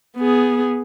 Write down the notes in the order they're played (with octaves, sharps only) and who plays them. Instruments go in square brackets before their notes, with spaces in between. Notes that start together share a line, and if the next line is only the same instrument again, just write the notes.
[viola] B3 G#4